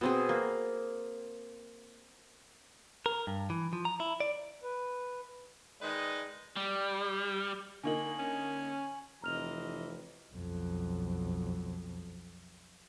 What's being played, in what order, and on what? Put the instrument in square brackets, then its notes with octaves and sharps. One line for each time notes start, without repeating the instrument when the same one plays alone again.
[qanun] B2 C4 G#4
A#3
[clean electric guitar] A#4
G2
E3
F3
A#5
E4
D5
[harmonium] B4
[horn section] D#3 G#3 B4 D5 D#5
[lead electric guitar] G3
[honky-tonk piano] D3 A#3 D#4 [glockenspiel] G#5 C#6 F#7
[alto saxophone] C#4 [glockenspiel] G#5
[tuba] F1 [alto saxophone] E3 [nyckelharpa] C4 D#5 [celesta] A#5 F6 F7
[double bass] B1 F2